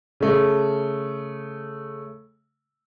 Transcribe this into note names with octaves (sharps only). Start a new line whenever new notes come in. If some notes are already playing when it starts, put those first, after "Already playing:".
C#3 A3